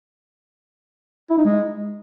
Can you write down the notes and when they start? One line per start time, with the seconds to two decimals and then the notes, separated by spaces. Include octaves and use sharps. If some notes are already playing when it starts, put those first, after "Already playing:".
1.30 E4
1.37 D#4
1.45 G#3